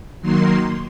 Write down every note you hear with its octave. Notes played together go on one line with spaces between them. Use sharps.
D#3 F#3 A#3 C6